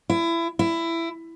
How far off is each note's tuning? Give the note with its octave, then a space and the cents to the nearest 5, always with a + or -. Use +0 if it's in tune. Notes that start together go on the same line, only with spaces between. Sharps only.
E4 +25
E4 +15